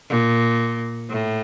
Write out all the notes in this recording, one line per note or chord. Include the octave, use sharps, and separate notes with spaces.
A#2
A2